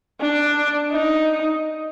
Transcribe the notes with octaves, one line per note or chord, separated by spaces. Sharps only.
D4
D#4